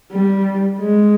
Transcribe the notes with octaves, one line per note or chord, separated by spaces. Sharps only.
G3
G#3